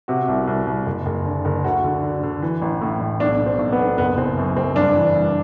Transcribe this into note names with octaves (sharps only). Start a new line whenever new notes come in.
C3 F#4
C2
C2
C2
F#1
F#1
D3
F#1
D2 F#4
D3
D3
D3
E3
A1
A2
A1
B1 D4
B2
C4
B1
B3
B1
F#1 B3
F#1 C4
F#2
F#1 C4
G2 D4
E3
G2